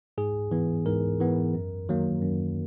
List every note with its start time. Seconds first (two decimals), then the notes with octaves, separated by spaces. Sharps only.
0.18 G#2 G#4
0.51 E3 B3
0.86 G#2 A#4
1.20 E3 B3
1.54 F#2
1.89 D#3 F#3 A#3
2.22 F#2